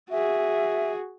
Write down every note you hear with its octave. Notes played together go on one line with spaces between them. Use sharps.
F#4 G#4 E5